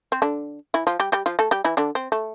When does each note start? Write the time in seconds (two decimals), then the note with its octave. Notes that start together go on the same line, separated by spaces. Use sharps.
0.12 C4
0.22 D3 D4
0.74 E3 E4
0.87 F3 F4
1.00 G3 G4
1.12 G3 G4
1.26 F3 F4
1.39 A3 A4
1.51 G3 G4
1.64 E3 E4
1.77 D3 D4
1.95 C4
2.12 A3